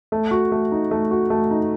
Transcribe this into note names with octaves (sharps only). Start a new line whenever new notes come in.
A3
F#4
A3
D#4
A3
F#4
A3
D#4